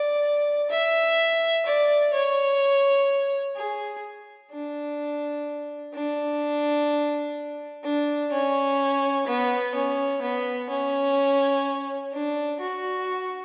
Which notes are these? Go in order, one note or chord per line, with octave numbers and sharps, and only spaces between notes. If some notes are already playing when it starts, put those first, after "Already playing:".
Already playing: D5
E5
D5
C#5
G#4
D4
D4
D4
C#4
B3
C#4
B3
C#4
D4
F#4